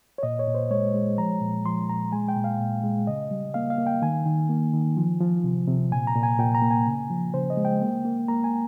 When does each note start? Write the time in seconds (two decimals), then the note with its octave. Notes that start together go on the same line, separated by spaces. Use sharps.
0.18 C#5
0.23 A#2 D#5
0.39 C#5
0.47 A#2
0.54 C5
0.71 G#3 C#5
0.94 G#3
1.18 F3 A#5
1.42 A#2
1.65 F3 C6
1.89 A#2 A#5
2.12 G#3 G#5
2.29 G5
2.36 A#2
2.44 F5
2.60 A#2
2.83 G#3
3.07 C#3 D#5
3.31 G3
3.54 A#3 F5
3.70 F5
3.78 A#3
3.87 G5
4.02 D#3 G#5
4.26 D#3
4.49 A#3
4.73 D#3
4.97 F3
5.21 F3
5.44 C3
5.67 C3
5.91 A#2 G#5
6.07 A#5
6.16 A#2
6.23 G#5
6.39 A#2 G5
6.55 A#5
6.62 A#3
6.71 G#5
6.86 C#3
7.10 F3
7.34 C#3 C5
7.50 D#5
7.57 G#3
7.65 G5
7.82 A#3
8.05 A#3
8.28 A#3 A#5
8.44 G#5